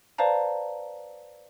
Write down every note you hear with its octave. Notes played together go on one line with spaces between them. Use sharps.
B4 C5 D5 F5 A5 A#5